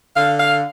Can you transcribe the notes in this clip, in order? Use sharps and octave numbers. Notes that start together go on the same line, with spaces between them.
D3 F5
F5